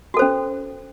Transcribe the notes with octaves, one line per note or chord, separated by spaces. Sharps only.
C#4 F#4 A4 C5